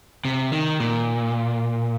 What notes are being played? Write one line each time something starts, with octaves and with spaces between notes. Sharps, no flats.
C3
D#3
A#2